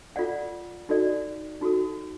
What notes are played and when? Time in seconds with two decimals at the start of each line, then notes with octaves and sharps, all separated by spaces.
0.16 F4 A4 D5 F#5
0.89 D#4 F#4 A4 D5
1.61 D#4 F#4 A4